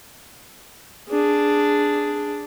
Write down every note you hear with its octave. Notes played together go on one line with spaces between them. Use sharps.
D4 G#4